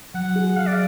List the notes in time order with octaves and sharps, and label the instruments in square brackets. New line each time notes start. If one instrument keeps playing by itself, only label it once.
[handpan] F#3 [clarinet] F#5
[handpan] G#4
[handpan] F#3 [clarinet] F5
[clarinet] D5